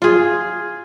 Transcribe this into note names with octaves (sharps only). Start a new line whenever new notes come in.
F4 G#4